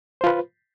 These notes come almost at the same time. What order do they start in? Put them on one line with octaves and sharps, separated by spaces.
C5 F4 B4